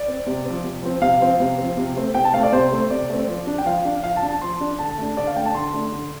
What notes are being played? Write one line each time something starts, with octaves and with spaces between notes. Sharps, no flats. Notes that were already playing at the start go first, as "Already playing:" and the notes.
Already playing: D5
C4
C3
F3 C4
C3
F3 C4
C3 F5
F3 C4
C3
F3 C4
C3
A3 C4
C3 G5
A5
A3 C4 F5
D5
C3 C5
A3 C4
C3 D5
A3 C4
F3
D4
G5
F3 F5
D4
F3 F5
A5
D4
A5
F3 C6
D4
D3 A5
A3 D4
D3 D5
F5
A3 D4 G5
A5
D3 C6
A3 D4
D3